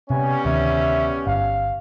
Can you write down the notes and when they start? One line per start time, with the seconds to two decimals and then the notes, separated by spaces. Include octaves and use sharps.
0.10 C3 G3 B3 C#4 G#5
0.45 D2 C3 D#3 E5
1.27 G1 F5